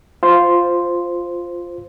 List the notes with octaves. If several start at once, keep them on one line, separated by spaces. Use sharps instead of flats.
F4 C5